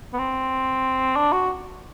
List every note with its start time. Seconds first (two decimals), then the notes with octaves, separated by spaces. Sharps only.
0.13 B3
0.18 C4
1.16 D4
1.33 F#4